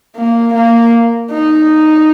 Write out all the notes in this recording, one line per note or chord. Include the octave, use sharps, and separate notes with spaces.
A#3
A#3
D#4